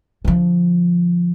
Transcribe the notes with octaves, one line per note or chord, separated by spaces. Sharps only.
D3 F3